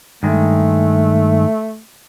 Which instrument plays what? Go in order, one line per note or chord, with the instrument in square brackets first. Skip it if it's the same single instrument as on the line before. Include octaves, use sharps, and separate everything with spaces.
[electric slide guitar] G2 D#3 G#3 [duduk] A3